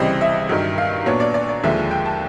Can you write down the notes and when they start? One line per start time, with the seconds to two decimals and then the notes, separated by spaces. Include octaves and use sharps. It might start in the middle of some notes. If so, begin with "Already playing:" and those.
Already playing: C#2 C3 E3 G3 C4 D#5
0.21 E5
0.49 G2 D#3 F#3
0.78 F5
1.06 A#2 F#3 B3 D4 C#5
1.20 D5
1.34 D5
1.49 D5
1.63 D#2 D3 F3 G#3 E5
1.91 G5
2.06 A5